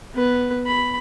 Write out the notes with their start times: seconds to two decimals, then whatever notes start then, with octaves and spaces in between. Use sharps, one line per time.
0.14 B3 B4
0.67 B5